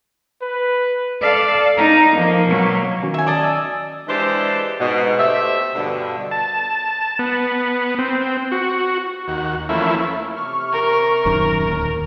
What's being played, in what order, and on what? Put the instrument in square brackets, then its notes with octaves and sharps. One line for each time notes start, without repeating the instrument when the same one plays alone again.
[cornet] B4
[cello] A4 F5 [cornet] D5
[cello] D#4 [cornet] A#5
[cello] F3 [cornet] A#3
[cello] B2 F#3
[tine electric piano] D#3 C#4 F#4
[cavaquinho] E5 G#5
D5 D#5 A5
[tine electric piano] G#5 E6
[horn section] E3 G#3 D4 G4 C5 A5
G#2 B2
A3 G4 C5 E5
G2 B2 D3
[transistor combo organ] A5
B3
C4
F#4
D#2 F#4
E3 F3 A3 A#3 C#4 E4
[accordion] C3 C#6 F6
[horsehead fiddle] A#4
[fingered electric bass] D#1 F#2 D#3
D1 D#2